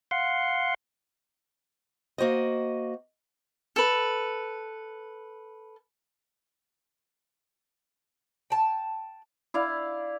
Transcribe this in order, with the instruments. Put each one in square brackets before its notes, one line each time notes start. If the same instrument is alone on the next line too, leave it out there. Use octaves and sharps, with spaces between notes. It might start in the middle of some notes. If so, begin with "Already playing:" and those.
[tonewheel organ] F5 F#5 C6
[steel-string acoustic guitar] A#3 F#4 C5 D#5
[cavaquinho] A4 B4
[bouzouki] G5 A5
[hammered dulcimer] E4 D5 F5